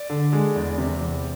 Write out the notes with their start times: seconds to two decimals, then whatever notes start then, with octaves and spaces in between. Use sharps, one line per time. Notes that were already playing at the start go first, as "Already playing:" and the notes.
Already playing: D5
0.10 D3
0.33 G#3
0.55 E2
0.78 C3
1.01 E2